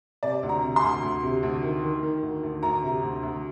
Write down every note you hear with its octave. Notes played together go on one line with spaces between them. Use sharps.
C3 D5
D2
A#5
C3
C6
D2
D2
C3
D2
D#3
D#3
D#3
D2
D2
D2 A#5
C3
D2
D2